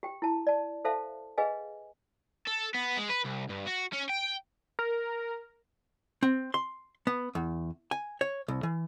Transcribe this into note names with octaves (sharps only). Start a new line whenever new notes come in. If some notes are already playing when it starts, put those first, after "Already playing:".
G4 G5
E4 A5
D5 A5
A4 C5 E5 F5 A5
G#4 B4 D#5 F5 G#5
A4
B3
G#3
B4
C2
G2
F#4
C#4
G5
A#4
C4
C6
B3
E2
G#5
C#5
C2
E3